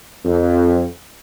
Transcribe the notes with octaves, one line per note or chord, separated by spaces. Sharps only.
F2